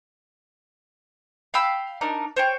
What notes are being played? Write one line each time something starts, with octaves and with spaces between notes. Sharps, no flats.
F5 G5 B5 E6
D4 D#4 A#4
C5 C#5 G5